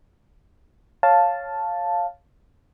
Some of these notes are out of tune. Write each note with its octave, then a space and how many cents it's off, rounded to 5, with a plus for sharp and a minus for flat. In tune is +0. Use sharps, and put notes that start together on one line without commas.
C#5 +0 F5 +0 A5 +0